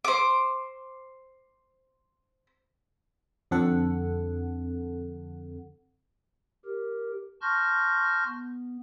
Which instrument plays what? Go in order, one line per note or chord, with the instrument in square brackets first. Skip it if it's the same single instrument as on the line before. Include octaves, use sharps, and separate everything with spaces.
[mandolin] C5 D6
[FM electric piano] F2 D3 C4 A4 F#5
[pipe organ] G4 A#4
A5 C6 C#6 F6 G6 A#6
B3